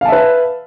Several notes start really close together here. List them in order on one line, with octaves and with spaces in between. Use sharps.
F5 A5 E5 B4